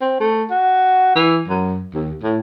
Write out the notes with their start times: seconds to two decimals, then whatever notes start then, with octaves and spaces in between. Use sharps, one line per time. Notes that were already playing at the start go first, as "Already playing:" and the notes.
0.01 C4
0.20 A3
0.51 F#4
1.15 E3
1.48 F#2
1.94 D#2
2.23 A2